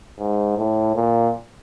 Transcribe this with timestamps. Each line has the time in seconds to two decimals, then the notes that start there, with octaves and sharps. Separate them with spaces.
0.19 G#2
0.58 A2
0.96 A#2